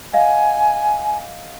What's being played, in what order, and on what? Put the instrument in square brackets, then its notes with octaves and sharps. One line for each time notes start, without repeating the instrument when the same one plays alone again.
[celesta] D#5 F5 F#5 [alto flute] G#5